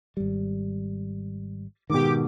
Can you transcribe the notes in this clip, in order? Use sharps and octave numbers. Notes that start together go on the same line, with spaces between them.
G#1 G3
G#2 B2 D#3 G4 D6